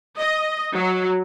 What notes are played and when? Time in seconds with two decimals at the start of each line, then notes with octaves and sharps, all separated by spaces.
0.17 D#5
0.75 F#3